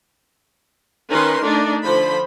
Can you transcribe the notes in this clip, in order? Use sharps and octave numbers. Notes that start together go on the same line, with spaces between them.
D#3 C#4 D#4 A#4 B4 C6
A3 D4 D#4 D5
D3 F3 C5 B5